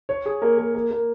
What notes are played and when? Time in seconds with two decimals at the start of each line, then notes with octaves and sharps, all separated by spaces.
0.09 C#5
0.26 G#4
0.42 A#3
0.58 A#3
0.74 A#3
0.91 A#3